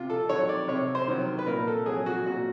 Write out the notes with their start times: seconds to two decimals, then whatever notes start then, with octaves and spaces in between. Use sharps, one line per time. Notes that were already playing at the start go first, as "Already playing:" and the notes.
Already playing: C3 F4
0.10 A4
0.29 D#3 F#3 C#5
0.49 D5
0.68 C3 C#5
0.95 C5
1.08 D#3 F#3
1.39 B4
1.47 A#2 A#4
1.68 A4
1.86 F#3 G#4
2.06 F#4
2.26 A#2 F#4